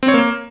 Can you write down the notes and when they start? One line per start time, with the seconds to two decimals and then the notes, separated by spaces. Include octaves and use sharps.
0.03 C4
0.08 C#5
0.14 A#3